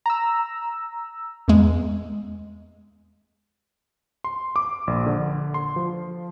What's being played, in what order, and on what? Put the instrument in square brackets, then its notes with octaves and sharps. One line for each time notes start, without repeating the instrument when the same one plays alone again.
[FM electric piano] A#5 E6
[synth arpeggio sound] E2 G#3
[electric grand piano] C6
D6
A#1
D3
C6
F3